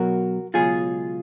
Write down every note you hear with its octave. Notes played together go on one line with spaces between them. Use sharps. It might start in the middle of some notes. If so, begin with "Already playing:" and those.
Already playing: B1 B2 F#3 F#4 A#4
C#2 B2 F#3 F4 G#4